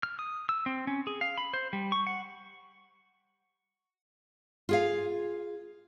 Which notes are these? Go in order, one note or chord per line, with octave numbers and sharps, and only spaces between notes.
F6
D#6
E6
C4
C#4
G#4
F5
B5
C5
G3
C#6
F#5
F4 G#4 F5